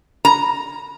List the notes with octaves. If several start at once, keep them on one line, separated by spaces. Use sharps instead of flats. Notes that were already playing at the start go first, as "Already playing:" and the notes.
A#5